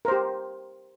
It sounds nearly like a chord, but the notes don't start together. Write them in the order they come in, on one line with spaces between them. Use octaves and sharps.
A#4 C5 G4